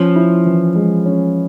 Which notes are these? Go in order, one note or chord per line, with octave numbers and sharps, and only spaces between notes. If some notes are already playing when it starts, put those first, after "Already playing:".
Already playing: F3 C#4
E4
E3
G#3
C#4